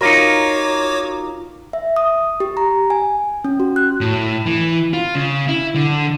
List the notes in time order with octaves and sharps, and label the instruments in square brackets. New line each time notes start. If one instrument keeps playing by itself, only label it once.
[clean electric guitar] D#4 F4 A#4 [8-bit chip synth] F#4 C#5 D6
[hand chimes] E5
D#6
G4
A#5
G#5
C#4
F#4
F#6
[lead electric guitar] A2
E3
F4
C#3
E4
D3